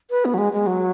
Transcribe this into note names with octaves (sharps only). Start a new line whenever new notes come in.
B4
B3
F#3
G#3
G#3
F#3